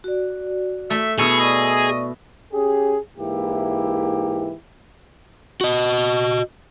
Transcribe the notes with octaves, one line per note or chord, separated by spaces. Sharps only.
F#4 D5
A3 E5
B2 E4 G#4 C#6
D5 D#5 C#6
C#4 G4 G#4
G#2 E3 A#3 E4 G4
F#4 D#5